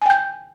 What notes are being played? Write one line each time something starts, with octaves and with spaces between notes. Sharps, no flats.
G5 G#5 G6